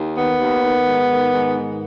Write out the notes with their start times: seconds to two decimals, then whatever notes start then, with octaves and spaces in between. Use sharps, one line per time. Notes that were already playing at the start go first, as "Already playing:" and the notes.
Already playing: D#2
0.16 D#3 B3
0.39 D#2
0.63 D#3
0.86 G#2
1.09 D#3
1.33 G#2
1.56 D#3